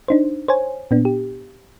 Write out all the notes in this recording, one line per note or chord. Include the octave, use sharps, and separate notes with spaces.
D4 D#4 C5
C5 C#5 G#5
A#2 B3 D4
G4